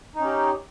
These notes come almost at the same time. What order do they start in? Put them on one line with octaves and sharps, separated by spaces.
D#4 C#4 G4